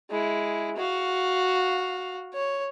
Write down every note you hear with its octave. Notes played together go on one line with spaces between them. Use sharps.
G#3 E4
F#4 F5
C#5